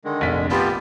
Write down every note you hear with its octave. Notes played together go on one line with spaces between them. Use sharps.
D3 D#3 G#3
F1 A#1 B6
B3 F4 G4 A5 B5